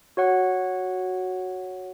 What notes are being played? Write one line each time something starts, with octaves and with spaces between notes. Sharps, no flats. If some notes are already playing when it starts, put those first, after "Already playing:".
F#4 C#5 F#5